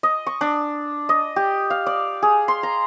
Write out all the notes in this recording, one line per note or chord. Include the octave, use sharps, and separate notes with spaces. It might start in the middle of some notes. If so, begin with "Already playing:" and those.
D#5
C#6
D4
D#5
G4
F5
D5
G#4
C6
A#5